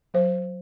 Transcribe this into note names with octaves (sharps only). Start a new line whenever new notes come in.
F#3 C5